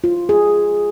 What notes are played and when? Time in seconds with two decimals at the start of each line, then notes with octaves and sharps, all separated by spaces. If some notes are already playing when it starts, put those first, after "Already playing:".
0.04 F4
0.29 G#4